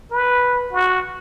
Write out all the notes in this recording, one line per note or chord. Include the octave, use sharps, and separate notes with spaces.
B4
F#4